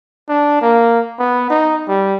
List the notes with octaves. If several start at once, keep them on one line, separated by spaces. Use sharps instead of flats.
D4
A#3
B3
D#4
G3